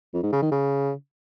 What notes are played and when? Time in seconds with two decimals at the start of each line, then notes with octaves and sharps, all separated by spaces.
0.14 F2
0.23 G#2
0.33 C#3
0.42 D#3
0.52 C#3